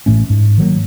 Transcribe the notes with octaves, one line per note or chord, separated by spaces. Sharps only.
A1 A2 A3 C#4
G#2
D#3 F#3 A#3